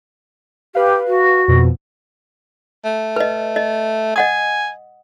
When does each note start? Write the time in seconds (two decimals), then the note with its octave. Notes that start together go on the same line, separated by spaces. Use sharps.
0.75 G4 B4 F5
1.07 F#4
1.48 F2 B2
2.85 A3
3.16 B4 D#5
3.56 D#5
4.16 D#5 F#5 G#5 D#6